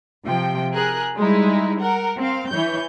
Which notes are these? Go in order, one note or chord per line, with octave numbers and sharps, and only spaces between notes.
C3 F3 G5
G#4 A#4 F#6
G3 G#3 D#4 E4
A#4 F#5
C4 F5
E3 C#5 G6